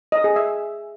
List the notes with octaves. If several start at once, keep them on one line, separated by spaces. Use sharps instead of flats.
D#5
G#4
E5